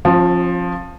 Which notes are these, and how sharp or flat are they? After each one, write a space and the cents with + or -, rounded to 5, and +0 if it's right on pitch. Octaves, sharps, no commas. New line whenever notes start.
F3 +10 C#4 -45